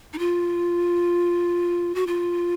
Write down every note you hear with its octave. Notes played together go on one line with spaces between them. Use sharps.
D#4
F4
F#4
F4